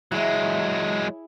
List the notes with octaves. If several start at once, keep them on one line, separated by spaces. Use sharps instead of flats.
F#3 G#3 E4 G#4